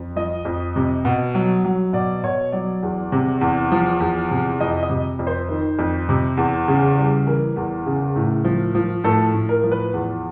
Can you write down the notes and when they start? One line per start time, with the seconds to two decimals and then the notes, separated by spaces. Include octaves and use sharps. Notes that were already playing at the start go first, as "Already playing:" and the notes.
Already playing: F2
0.16 F3 D#5
0.45 F2
0.76 C3
1.05 B2
1.35 F#3
1.65 F#3
1.93 B2 D5
2.23 B2 C#5
2.52 F#3 D5
2.83 E2
3.12 C3
3.41 E2
3.72 F3
4.00 E2
4.31 C3
4.60 F2 D#5
4.82 D#5
4.90 C3
5.19 F2
5.27 C5
5.49 D#3
5.79 F2
6.09 C3
6.37 E2
6.68 C#3
6.98 G3
7.26 E3 A#4
7.56 E2
7.86 C#3
8.16 A2
8.45 F3
8.75 F3
9.04 A2 A4
9.33 A2
9.49 A#4
9.63 F3
9.71 B4
9.94 E2